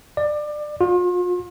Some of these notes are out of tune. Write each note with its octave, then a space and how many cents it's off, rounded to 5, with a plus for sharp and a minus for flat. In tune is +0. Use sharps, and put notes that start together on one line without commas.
D5 +25
F4 +40